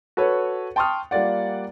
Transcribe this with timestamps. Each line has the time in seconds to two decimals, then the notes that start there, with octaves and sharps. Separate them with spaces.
0.17 F#4 A4 B4 C#5
0.76 G5 A5 C6 C#6 D#6 F6
1.11 G3 A#3 F4 D5 F#5